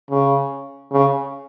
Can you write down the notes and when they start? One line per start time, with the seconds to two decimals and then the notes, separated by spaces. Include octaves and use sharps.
0.11 C#3
0.92 C#3